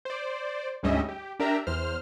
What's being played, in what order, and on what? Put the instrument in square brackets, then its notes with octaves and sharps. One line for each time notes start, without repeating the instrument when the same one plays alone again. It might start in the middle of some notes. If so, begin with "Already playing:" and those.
[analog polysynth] C5 D5
D2 G#2 G3 C#4 D#5 E5
G4
D4 G4 A#4 E5 A#5
E2 C5 F6